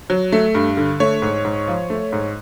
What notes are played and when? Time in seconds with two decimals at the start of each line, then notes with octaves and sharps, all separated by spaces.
0.10 F#3
0.33 A3
0.55 G2
0.77 D3
1.00 A3 C#5
1.22 G#2
1.45 G#2
1.68 F3
1.90 A3
2.12 G#2